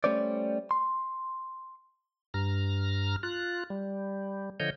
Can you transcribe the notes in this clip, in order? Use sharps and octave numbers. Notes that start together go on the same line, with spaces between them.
G3 A3 C#4 C5 D5
C6
G2 A#5 F6
F4 F#6
G3
D3 F3 C#5 D#5 G6